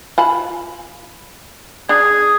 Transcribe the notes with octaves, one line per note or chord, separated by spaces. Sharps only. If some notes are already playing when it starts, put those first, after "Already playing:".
F4 A5 B5
D4 G#4